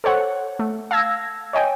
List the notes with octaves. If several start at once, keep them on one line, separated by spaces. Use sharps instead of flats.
A4 C5 C#5 F#5
A3
F5 A5 E6 G#6 A#6
C#5 D#5 G5 G#5